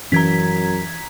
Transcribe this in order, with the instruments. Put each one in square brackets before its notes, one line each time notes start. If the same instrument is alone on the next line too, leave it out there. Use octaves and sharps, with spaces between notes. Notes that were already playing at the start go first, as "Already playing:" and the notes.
[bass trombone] F#2 [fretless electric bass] E3 C#4 [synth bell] A#5 G#6 B6